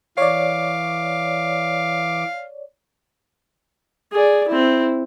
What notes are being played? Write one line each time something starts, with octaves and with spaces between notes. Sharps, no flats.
E3 C#5 D5 F5 D6
G#4 D5
C4 E4